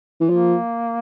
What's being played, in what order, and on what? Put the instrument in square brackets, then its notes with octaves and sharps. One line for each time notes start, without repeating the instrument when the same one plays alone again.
[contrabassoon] E3
[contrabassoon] F3 [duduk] A#3